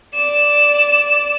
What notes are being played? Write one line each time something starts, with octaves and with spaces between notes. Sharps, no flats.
D5 E7